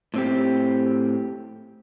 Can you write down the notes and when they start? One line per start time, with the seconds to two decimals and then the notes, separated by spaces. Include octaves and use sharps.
0.14 A2 C4 G4